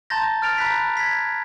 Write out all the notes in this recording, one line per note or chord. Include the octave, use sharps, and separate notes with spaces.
A5 A#5 C6 G6 A6 A#6
F6 A6 D7 F7
A#5 B5 F#6 G6 B6
G#6 B6